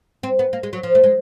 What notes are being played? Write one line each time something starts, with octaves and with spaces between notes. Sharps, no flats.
C4
B3
A#3
G#3
F#3
F3
A3
G#3